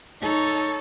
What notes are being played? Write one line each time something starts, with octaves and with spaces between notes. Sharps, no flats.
D#4 A4 C#5